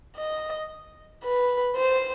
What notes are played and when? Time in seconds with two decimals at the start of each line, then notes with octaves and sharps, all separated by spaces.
0.17 D#5
1.24 B4
1.77 C5